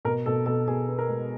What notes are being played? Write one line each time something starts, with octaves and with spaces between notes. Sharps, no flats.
B2 A#4
B2 A4
B2 A4
B2 G#4
B3
A#4
G#3